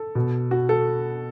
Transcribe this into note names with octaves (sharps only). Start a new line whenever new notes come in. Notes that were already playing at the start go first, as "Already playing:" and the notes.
Already playing: A4
B2
F#4
A4